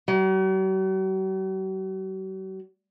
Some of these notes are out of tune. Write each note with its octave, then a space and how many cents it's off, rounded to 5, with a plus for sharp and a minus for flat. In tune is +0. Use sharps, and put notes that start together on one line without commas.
F#3 +45